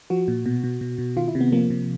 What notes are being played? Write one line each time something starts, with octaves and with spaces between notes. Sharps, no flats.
F3 F#4
A#2
B2
B2
B2
B2
D#3 F4
E4
C3
B3
F3 A#3
C3